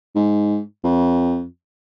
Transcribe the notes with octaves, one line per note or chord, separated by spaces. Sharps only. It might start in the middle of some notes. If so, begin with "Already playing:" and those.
G#2
F2